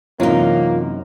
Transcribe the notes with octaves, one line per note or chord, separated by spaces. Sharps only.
F#2 C3 E3 A#3 C4 D#4 F4